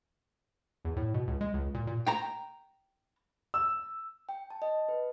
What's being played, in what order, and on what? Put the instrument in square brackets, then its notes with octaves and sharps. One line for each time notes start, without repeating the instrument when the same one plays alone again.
[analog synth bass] E2
A2
B2
C#2
G#3
C#2
A#2
A#2
[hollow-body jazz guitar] G5 A#5
[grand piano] E6
[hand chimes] G5
A5
D#5
B4